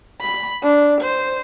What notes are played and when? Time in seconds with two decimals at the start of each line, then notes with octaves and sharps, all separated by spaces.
0.21 B5
0.63 D4
1.01 C5